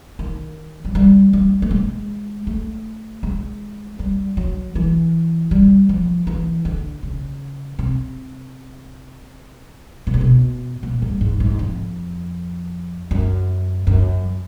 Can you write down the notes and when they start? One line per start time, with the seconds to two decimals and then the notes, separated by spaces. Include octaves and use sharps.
0.19 D#3
0.85 F#3
0.95 G3
1.33 G3
1.62 A3
1.71 G#3
2.47 A3
3.23 G#3
3.99 G3
4.37 F#3
4.75 E3
5.51 G3
5.89 F3
6.27 E3
6.65 D3
7.03 C#3
7.79 C3
10.07 B2
10.14 A#2
10.21 B2
10.83 A#2
11.02 G2
11.21 G#2
11.40 G#2
11.59 F2
13.11 F#2
13.87 F#2